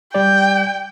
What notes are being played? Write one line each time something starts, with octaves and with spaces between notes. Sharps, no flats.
G3 D5 G5